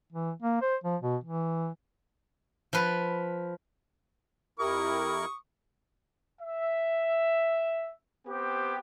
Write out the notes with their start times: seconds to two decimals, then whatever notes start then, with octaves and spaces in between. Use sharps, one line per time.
0.12 E3
0.42 A#3
0.62 C5
0.84 F3
1.02 B2
1.24 E3
2.73 F3 B4
4.59 F2 E4 G4 A#4 C#6 D#6
6.40 E5
8.26 B3 C4 G4